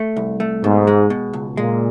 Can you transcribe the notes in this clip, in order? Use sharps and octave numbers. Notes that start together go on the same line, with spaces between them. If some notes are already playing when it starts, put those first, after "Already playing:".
Already playing: A3
C2
A3
G#2 B2
G#3
B2
C#2
A#2 G#3